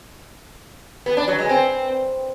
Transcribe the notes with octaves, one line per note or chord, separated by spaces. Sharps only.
B3
D4
F#3
G#3
C4